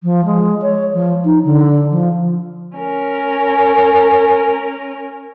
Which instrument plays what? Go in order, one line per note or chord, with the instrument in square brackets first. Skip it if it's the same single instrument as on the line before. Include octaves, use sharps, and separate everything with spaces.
[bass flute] F3
G#3
C#5
F3
D#4
D3
F3
[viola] C#4 A#4